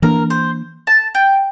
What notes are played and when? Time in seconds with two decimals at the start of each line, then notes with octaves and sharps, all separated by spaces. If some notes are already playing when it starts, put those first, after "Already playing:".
0.02 E3 A#3 D4 A#4
0.30 C5
0.87 A5
1.15 G5